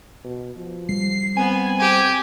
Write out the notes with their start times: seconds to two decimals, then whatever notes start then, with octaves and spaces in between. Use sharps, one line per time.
0.25 B2
0.57 F3
0.89 G3 C7
1.37 B3 C4 G#5
1.80 G4 G#5